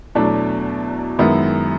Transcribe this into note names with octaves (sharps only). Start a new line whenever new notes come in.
E2 B2 F#3 A3 D4
F#2 D#3 G#3 B3 E4